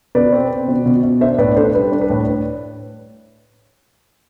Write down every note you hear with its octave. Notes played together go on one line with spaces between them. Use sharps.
B2 B4 D5
C4
C4
B2
B2
B2
D4 C5 E5
A2 B4 D5
D4 A4 C5
G3 B4
D4
B4
A2